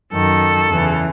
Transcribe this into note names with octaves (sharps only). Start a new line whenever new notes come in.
F#2 D#3 A4
E2 C#3 E3